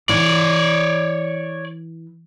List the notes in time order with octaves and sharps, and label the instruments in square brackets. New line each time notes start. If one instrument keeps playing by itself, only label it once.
[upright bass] E3 [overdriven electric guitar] C#5 D5